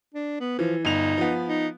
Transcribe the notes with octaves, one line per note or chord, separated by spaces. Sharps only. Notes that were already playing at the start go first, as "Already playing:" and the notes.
D4
B3
E3 F3
G1 D#4 F7
F3 B3
D#4